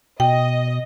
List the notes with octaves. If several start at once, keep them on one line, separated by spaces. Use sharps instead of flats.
B2 D#5 G5